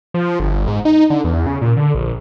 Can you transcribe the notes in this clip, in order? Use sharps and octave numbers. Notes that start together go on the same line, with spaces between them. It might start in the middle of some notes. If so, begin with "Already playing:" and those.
F3
G1
G#2
D#4
D3
E2
C#3
A#2
D3
A#1